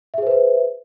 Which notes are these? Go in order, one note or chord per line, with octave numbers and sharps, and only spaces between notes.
G#4 B4 C5 E5